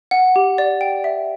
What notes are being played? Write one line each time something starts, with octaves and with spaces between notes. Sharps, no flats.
F#5
G4
D5
G5
E5